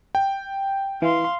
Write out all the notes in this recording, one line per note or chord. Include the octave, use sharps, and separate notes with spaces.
G5
E3 F5 C6